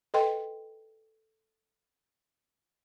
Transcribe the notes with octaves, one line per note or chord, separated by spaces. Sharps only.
A4 B4 D#5 G5 C6